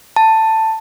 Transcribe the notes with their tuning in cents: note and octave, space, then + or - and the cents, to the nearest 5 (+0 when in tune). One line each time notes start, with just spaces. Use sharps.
A5 +10